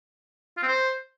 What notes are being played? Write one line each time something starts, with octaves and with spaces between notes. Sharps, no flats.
F4
C4
C5